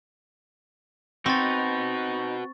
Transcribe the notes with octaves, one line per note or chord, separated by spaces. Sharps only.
C4 D#4 F#4 B4 C#6 A6